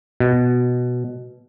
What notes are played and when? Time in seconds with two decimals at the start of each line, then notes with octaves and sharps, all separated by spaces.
0.20 B2